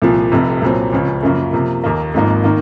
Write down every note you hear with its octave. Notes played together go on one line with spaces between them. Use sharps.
C2 A#2 F3
F1 F2 C3
C2 A#2 F#3 C4
C#2 C#3 F3
F#2 C#3 F3 A#3
C3 F3 A#3
D#2 D#3 A#3
G#1 G#2 F3 A#3 D#4
D#3 A#3